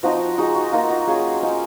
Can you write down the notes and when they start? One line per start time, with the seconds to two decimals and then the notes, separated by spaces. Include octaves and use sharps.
0.03 F3 C4 D#4 F#4
0.38 G#3 D#4 F#4
0.56 F#4
0.72 A#3 D#4 F4
0.90 F#4
1.07 F#3 C#4 F4 G#4
1.43 G#3 C#4 F4 C5